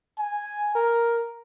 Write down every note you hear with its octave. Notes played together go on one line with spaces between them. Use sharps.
G#5
A#4